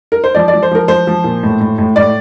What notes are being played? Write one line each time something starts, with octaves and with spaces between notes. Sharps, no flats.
A#4
C5
F3 D5
D5
F3
C5
F3 A#4
F3 C5
F3
A#2
A2
A2
A2
A2 D5